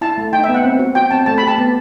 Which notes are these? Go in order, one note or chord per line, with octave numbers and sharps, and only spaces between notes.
E4 A5
A3
D#4 G5
B3 E5
F#5
C4
F#4
F#4 G5
C4 A5
A3 A5
B5
G4 A5
B3